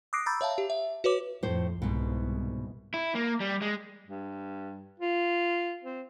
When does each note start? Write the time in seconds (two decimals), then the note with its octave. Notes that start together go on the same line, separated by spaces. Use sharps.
0.13 D6 D#6 F#6 A#6 C7 D7
0.26 A#5 B5 D6 E6 G6 A6
0.41 C#5 E5 F5 A5
0.58 G4
0.70 E5
1.04 F#4 B4 C#5 D6
1.43 F2 A2 C5
1.82 C2 G#2 B2
2.94 E4
3.15 A#3
3.40 G3
3.62 G#3
4.07 G2
5.00 F4
5.84 C4